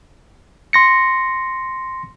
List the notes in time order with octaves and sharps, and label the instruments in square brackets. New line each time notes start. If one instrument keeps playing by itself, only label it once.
[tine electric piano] C6 A#6 C#7